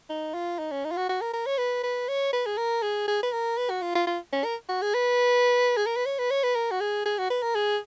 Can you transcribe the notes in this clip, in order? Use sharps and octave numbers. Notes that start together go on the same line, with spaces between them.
D#4
F4
D#4
C#4
D#4
F4
F#4
F#4
A#4
A#4
C#5
B4
B4
C#5
B4
G#4
A#4
G#4
G#4
B4
A#4
B4
F#4
F4
F4
F4
C#4
A#4
F#4
G#4
B4
G#4
A#4
B4
C#5
B4
C#5
B4
A#4
F#4
G#4
G#4
F#4
B4
A#4
G#4